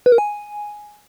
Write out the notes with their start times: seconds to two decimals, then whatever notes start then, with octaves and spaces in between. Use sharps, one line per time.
0.06 B4
0.12 A#4
0.18 G#5